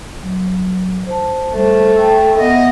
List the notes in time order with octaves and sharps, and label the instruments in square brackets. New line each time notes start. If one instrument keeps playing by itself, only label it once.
[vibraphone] F#3
C5 A5
[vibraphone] G3 C5 [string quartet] A3
[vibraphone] G5 A5 E6
[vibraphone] B3 E5 F#5 [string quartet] D#5